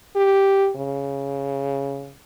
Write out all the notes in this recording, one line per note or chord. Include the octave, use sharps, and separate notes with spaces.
G4
C#3